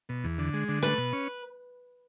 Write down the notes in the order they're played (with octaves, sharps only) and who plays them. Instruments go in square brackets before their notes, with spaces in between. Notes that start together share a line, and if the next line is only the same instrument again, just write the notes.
[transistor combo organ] B2
E2
D3
G#3
D3
[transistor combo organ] A3 [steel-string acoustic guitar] B4
[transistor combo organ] B2
C#4